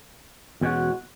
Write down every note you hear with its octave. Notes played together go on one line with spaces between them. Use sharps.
E2 B2 G#3 C#4 F#4